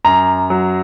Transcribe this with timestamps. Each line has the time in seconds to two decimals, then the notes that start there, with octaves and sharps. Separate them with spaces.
0.04 F#2 A#5
0.50 F#3